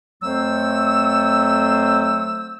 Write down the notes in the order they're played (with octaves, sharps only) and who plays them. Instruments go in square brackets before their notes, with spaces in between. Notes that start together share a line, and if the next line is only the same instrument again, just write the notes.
[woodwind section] F2 F#3 A3 C5 E6